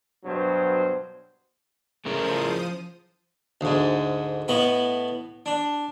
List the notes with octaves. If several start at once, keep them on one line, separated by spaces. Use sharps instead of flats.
G2 B2 F#3 C5
C#3 F3 A3 E4 A#4 C5 D#6
D2 G#2
A2 B3 D#5 B5
D4